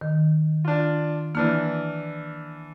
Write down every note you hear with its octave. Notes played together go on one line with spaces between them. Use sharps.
D#3
D4 F4
E3 A#3 D4 F6